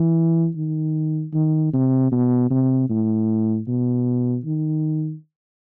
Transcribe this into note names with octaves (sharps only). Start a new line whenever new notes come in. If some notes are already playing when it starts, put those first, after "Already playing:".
Already playing: E3
D#3
D#3
C3
B2
C3
A2
B2
D#3